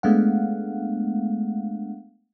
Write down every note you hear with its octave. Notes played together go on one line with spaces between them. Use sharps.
G#3 A3 B3 D4 F5 F#5